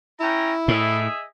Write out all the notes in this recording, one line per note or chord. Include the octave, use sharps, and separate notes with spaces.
C#4 E4 G5 A#5
A2 G#4 D#5 E5